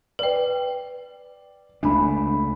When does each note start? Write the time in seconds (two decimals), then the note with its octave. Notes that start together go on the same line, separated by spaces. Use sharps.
0.19 B4 D5 G5
1.83 C#2 A3 D4 G#5 B5